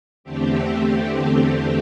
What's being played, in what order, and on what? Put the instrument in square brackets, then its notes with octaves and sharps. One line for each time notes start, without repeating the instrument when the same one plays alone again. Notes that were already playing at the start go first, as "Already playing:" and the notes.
[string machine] E2 D3 A3 C4 G4